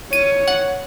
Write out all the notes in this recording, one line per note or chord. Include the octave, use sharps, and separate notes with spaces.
C#5 D#7
F#5